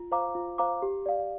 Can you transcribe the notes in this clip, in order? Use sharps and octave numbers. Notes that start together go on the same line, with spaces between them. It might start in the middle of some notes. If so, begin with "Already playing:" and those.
Already playing: F4
C5 F5 A#5 D6
F4
C5 F5 A#5 D6
G4
D5 F5